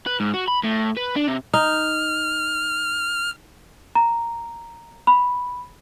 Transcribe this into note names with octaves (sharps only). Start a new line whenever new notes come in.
B4
G#2
F#4
B5
A2
B4
D4
C3
D#4 F6
A#5
B5